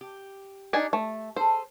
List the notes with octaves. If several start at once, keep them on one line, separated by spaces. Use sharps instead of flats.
G4
D4 D#4 G#5
A3
G#4 A4 C5